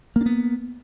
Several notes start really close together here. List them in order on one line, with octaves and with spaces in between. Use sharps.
A#3 D4 B3